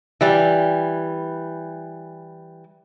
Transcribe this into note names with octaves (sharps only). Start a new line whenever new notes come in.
E3 G3